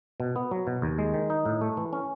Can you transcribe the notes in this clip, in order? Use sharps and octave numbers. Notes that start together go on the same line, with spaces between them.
B2
B3
F#3
B2
D#2
G#3
D#3
D#4
A2
A3
E3
C#4